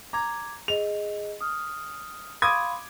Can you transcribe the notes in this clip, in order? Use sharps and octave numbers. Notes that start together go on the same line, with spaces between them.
A#5 D6 G#6
G#4 D#5 F7
D#6 F6
F5 B5 C6 D6 D#6 G#6